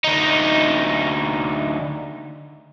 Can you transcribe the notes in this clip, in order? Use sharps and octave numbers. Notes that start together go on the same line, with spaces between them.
D2 D#4